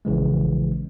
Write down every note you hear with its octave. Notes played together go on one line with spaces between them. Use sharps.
A#1 C#3 E3 G#3